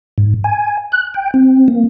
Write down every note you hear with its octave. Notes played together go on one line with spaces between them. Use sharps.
G#2
G#5
F#6
G5
C4
A#3